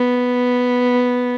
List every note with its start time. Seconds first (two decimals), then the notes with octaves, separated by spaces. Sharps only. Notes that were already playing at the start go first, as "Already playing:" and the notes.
Already playing: B3